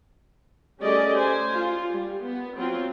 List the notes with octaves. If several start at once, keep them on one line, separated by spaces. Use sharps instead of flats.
G3 A3 C#4 G#4 D5 D#5
C5 G#5
F4
G3
B3
F#3 C4 F4